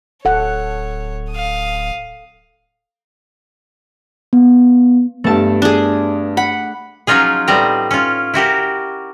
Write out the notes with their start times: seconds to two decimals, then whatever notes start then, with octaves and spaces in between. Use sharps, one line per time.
0.25 D1 A4 C#5 F#5
1.31 F5 D#6
4.33 B3
5.24 G2 A3 B3 A5
5.62 D4 G#4
6.37 F#5 B5
7.07 F3 F#3 C#4 D#4 F4 G#4
7.48 A2 G3 B3 C4 A#5
7.91 C#4 F4
8.34 E4 F#4 G4 A#4